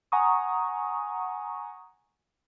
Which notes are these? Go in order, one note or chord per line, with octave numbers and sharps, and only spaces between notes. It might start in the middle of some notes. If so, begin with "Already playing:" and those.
F#5 G#5 A#5 C#6 D#6